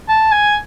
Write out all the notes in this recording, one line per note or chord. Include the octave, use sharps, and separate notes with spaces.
A5
G#5